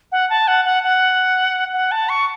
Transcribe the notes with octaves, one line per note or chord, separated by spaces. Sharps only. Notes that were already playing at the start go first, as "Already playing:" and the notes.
F#5
A5
F#5
F#5
F#5
F#5
A5
C#6